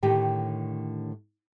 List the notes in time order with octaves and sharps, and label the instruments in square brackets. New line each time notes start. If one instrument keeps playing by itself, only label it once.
[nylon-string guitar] A2 D3 D#3 G4 G5